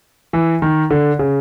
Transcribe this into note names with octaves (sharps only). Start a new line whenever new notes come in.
E3
D#3
D3
C#3